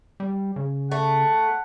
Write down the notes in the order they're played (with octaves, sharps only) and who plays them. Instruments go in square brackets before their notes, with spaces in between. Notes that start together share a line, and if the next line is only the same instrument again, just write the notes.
[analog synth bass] G3
C#3
[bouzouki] A3 [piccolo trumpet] F#5